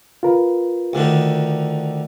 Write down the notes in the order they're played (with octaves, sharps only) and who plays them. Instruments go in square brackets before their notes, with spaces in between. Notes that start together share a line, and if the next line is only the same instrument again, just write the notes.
[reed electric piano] F4 A#4 B4
[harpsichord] D2 D3 D#3